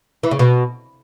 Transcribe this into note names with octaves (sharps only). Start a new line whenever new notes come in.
E3
C#3
B2